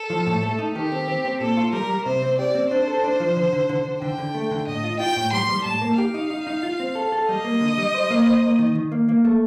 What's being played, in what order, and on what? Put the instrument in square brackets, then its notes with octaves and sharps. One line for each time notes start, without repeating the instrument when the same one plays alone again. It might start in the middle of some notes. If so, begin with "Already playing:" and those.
Already playing: [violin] A4
[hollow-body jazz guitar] F3
A2
A3
D#4
[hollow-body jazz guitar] D#3 [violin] G4
[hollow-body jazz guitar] C4
C4
C4
[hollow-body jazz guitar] A#2 [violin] A4
[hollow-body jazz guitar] F4
[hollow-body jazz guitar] G3 [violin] A#4
[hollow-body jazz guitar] G3
[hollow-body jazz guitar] C3 [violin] C5
[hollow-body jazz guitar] C4
[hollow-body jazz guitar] G4 [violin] D5
[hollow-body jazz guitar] C4
[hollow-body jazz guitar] D4 [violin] C5
[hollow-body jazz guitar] A4
D4
F3
D3
D3
D3
D3
[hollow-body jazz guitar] D3 [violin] G5
[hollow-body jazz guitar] D3
A3
D3
[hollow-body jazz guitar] A2 [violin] D#5
[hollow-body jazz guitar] F4
[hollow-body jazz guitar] F4 [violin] G5
[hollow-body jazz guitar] A2
[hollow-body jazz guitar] G3 [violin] C6
[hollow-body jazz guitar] G3
[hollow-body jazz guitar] A2 [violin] A5
[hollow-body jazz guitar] A#3
[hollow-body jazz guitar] G4 [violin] F5
[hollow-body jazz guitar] D#4
D#4
D#4
F4
C4
A4
A4
[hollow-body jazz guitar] G3 [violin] D#5
[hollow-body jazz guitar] A#3
D3
G3
C5
A#3
C5
A#3
D#3
D#3
A#3
A#3
A3